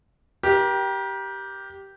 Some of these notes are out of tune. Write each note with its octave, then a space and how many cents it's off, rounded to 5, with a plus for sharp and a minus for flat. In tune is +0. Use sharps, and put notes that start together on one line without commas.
G4 -10 A#4 +35